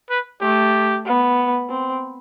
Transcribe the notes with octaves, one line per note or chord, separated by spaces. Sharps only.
B4
A3 G4
B3
C4